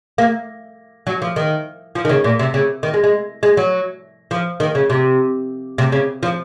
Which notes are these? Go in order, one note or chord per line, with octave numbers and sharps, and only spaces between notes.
A#3
F#3
F3
D#3
F3
D#3
C#3
A#2
C3
C#3
D#3
G#3
G#3
G#3
F#3
F3
D#3
C#3
C3
C3
C#3
F3